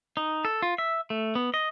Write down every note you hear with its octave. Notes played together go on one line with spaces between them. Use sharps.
D#4
A4
F4
E5
A3
B3
D#5